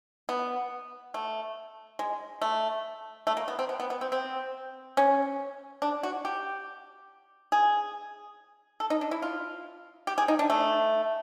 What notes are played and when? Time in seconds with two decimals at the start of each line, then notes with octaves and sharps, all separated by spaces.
0.29 B3
1.14 A3
1.99 G#3
2.42 A3
3.27 A3
3.37 A#3
3.48 B3
3.59 C4
3.69 B3
3.80 B3
3.90 B3
4.01 C4
4.12 C4
4.97 C#4
5.82 D4
6.03 F#4
6.25 G4
7.52 G#4
8.80 A4
8.90 D#4
9.01 D4
9.11 E4
9.22 F4
10.07 G4
10.18 G#4
10.28 D#4
10.39 D4
10.50 A3